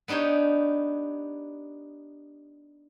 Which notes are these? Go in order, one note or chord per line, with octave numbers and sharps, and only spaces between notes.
B3 D4 D#4 G4 C#5